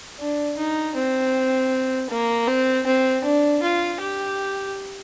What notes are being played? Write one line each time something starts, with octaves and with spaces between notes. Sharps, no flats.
D4
D#4
C4
A#3
C4
C4
D4
F4
G4